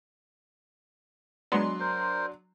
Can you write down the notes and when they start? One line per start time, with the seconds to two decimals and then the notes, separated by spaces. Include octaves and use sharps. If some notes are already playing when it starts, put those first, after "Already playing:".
1.52 F#3 G#3 B3 D4 C6
1.80 A#4 C5